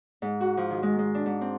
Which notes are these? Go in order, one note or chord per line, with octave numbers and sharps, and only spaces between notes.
G#2
F#4
F3
D#3
G#3
G#3
D4
G#2
C4